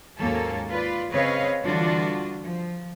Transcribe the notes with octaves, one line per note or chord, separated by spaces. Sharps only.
D#2 G#2 F#3 A#3 C#4 A4
F4 B4 D5
C#3 C4 B4 C#5 D#5 F5
D3 E3 G3 D4 F4 F#4
F3